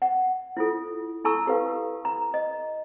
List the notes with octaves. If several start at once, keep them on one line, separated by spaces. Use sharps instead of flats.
F#5
E4 F4 A4
E4 A4 A5 A#5 C#6 E6
G4 A4 B4 F5
A#5
D#5